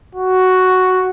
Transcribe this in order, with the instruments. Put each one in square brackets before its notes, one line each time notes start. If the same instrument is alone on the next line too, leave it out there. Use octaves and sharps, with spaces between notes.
[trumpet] F#4